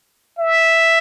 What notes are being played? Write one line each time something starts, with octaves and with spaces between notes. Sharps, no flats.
E5